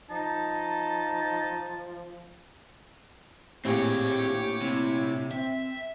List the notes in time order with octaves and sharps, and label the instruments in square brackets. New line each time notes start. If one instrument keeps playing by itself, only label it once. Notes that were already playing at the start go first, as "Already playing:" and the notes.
[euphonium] F3 [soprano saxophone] D#4 [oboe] A5
[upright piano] A#1 A2 [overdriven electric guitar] C4 G#4 [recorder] G4 [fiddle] C#5 D6
[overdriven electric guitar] C3 [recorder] E4
[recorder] C4 [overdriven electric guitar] E5